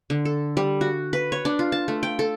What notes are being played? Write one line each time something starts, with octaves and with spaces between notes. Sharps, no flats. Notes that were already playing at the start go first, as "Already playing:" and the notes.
D3
A4
G3
F#4
B4
C#5
D4
F4
A5
A3
G5
A4